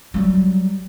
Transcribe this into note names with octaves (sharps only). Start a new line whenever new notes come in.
F#3 G3